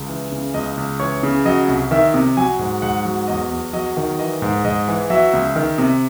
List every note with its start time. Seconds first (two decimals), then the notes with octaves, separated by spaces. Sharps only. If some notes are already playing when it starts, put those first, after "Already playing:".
Already playing: C#2
0.09 E3
0.32 C#3
0.54 C#2 D#5
0.77 C#2
1.00 E3 C#5
1.23 C#3
1.45 F#3 D#5
1.68 C2
1.91 D#3 E5
2.14 C3
2.37 F#3 G#5
2.59 G#2
2.82 G#2 F#5
3.05 F#3
3.28 E2 D#5
3.51 E2
3.73 F#3 D#5
3.97 D#3
4.19 E3 D#5
4.42 G#2
4.65 G#2 D#5
4.88 E3
5.10 F#3 E5
5.33 C#2
5.56 D#3
5.78 C3